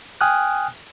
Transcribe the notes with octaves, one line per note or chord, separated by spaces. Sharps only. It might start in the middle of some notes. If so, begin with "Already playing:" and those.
G5 G#5 D#6 F6 F#6